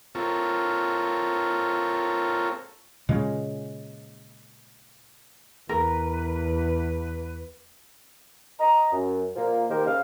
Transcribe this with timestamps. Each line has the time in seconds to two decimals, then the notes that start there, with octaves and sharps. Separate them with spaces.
0.15 C4 F4 A4 A#4 C#5
3.09 A#2 C#3 G#3
5.69 E2 A#4 B4
8.59 D#5 A#5
8.92 F#2
9.36 A#2 F3 A#3
9.69 D#3 A#3 G4 A#4 C5
9.86 C#3 F5